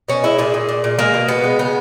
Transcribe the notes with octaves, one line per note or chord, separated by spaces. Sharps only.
B2 C#4
G#3 E4
A#2 G#4
A#2
A#2
A#2
G#3 A#3
B2
B2 B3
G#3
C#3 B3